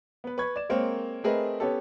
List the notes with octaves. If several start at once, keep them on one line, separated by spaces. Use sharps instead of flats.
B3 B4
B4 B5 C#6 G#6
D5 E7
G#3 A#3 C4 A#4 C5 C#5
A3 C4 G#4 A#4 B4 D#5
B3 C#4 G4 A4